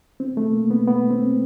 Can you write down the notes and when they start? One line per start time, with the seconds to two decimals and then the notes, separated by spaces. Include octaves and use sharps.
0.20 C4
0.37 A3
0.53 A#3
0.70 B3
0.88 B3
1.10 C4